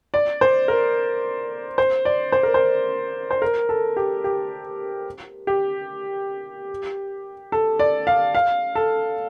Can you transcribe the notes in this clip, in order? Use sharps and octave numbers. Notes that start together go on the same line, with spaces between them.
D5
C5
A#4
C5
D5
C5
A#4
C5
C5
A#4
A4
G4
G4
G4
A4
D5
F5
F5
A4